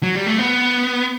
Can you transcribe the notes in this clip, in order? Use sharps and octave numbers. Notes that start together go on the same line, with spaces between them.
F#3
G3
A3
B3